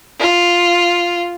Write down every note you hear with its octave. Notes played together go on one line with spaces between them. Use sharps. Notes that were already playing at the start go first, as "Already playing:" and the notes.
F4